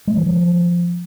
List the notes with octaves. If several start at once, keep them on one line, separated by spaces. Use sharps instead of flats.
G#3
E3
F3